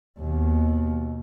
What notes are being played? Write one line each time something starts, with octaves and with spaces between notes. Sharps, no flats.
D#2 B2